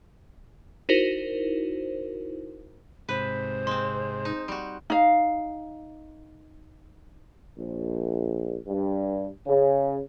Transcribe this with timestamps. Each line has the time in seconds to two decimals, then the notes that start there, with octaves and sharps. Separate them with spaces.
0.89 D#4 E4 F#4 A#4 C5
3.09 G#2 C3 B4 C5
3.67 G#3 C4 C6
4.25 D#4
4.48 G3 F#4
4.90 D#4 F5
7.57 A#1
8.67 G2
9.47 C#3